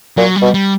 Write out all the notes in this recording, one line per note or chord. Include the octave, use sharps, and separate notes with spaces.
A#2 F#3
G3
B2
G3